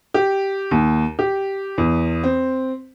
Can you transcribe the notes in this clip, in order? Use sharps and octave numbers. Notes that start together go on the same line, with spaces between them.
G4
D#2
G4
E2
C4